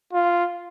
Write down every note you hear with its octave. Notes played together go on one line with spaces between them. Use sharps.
F4